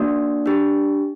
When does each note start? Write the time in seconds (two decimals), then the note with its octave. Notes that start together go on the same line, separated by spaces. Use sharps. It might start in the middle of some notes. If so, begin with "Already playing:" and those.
Already playing: A#3 D4 F#4 D5
0.46 D4 G4